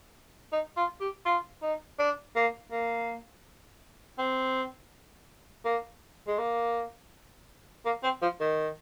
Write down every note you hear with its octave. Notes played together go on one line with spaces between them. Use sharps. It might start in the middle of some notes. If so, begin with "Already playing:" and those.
D#4
F4
G4
F4
D#4
D4
A#3
A#3
C4
A#3
G#3
A#3
A#3
C4
F3
D#3